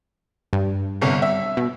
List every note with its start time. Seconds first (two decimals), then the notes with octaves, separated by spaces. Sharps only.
0.53 G2
1.01 G1 C2
1.22 E5
1.57 B2